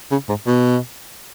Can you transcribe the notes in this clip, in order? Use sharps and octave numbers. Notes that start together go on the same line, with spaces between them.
C#3
G#2
B2